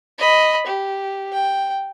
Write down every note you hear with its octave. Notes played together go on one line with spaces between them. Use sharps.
D#5 B5
G4
G5